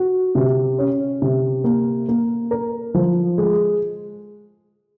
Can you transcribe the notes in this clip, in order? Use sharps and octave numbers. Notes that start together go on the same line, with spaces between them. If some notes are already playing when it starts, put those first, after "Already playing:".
Already playing: F#4
C3
C#4
C3
A#3
A#3
A#4
F3
G#3